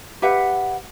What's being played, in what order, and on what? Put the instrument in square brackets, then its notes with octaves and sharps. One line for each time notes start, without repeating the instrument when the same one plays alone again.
[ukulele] G4 B4 E5 F#5